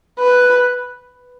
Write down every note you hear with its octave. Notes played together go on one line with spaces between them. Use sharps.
B4